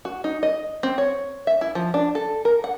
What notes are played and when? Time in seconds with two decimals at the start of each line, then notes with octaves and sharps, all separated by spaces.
0.05 F#4
0.24 D#4
0.43 D#5
0.83 C4
0.98 C#5
1.47 E5
1.61 E4
1.75 F3
1.94 D4
2.15 A4
2.45 A#4
2.64 F#5